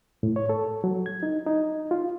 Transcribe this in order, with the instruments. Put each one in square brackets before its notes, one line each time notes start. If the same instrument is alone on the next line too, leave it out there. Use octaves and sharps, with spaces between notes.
[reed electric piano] A2
C#5
A4
F#3
G#6
D#4
D#4
F4